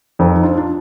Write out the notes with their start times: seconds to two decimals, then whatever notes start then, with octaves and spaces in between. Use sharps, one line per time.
0.19 F2 C4 D#4
0.36 D#4
0.43 D4 F4
0.57 D4